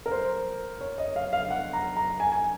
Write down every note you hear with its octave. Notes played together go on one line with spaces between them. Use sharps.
A#4
C5
C#5
D#5
F5
F5
F#5
A#5
A#5
G#5
G#5